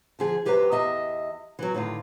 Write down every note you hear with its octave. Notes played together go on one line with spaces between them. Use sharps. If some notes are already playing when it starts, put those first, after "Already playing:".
D3 F3 G#4
F#2 G4 B4 C5 E5 A#5
E2 D#5 E5
E3 F#3
A2 D3 D#3 F4